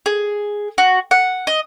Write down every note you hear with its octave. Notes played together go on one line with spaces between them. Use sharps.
G#4
F#4
F#5
D#5